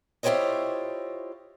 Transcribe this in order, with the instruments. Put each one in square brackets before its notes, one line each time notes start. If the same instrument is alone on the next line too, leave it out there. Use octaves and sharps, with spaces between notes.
[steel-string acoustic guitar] E4 F4 G4 C5 C#5 D#5